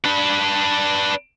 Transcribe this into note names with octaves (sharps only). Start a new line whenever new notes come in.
D4 B4